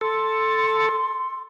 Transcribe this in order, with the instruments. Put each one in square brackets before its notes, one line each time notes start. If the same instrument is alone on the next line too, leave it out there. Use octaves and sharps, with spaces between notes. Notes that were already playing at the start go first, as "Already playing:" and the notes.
[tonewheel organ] A4 [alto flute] C6